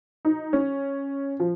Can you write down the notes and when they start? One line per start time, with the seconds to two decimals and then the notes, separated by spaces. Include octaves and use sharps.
0.25 D#4
0.53 C#4
1.40 F3